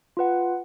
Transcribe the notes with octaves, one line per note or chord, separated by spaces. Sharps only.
F4 B4 F#5